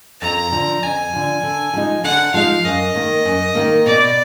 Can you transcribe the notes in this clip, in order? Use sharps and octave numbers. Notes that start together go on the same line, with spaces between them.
F2 A#5
D3 F3
F2 G#5
D3 F3
D3
F3 G#3 D#4
D3 F#5
F3 G#3 D#4 F5
F#2 D#5
D#3 A#3
F#2
D#3 A#3
B2 D5